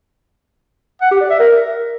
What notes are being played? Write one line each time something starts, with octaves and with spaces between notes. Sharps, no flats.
F#5
G4
D5
E5
A#4